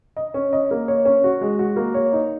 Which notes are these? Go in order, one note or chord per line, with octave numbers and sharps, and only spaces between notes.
D#5
C#4
D#5
A#3
C#5
C#4
F#4
G#3
F#4
A#3
C#5
D#4